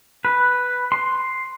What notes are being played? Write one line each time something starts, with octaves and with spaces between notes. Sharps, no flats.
B4
C6